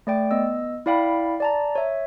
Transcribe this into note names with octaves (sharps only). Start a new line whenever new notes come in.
A3 D5 G5
B3 D#5 E6
E4 D5 F5 G5 B5
D5 A5 A#5
C#5 E5